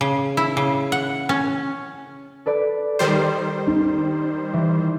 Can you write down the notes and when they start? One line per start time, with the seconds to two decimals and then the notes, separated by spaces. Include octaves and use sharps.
0.01 C#3
0.37 E4
0.57 C#3
0.92 F#5
1.29 C#4
2.46 A4 B4 D5
2.99 D#3 G3 C5 A6
3.67 D#4
4.53 E3